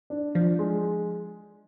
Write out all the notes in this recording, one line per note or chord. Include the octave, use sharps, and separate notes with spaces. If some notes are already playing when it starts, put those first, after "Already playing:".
D4
F3 D4
G#3